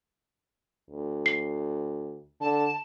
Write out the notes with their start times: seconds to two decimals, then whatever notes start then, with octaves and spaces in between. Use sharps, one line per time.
0.91 D2
1.26 C7
2.40 D3 A5